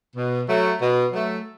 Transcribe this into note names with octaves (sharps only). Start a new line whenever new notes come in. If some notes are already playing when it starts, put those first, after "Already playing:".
B2
F#3 A3
B2
F#3 A3